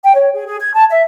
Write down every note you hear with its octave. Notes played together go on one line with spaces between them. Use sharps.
G5
C#5
G#4
G#4
G#6
A5
E5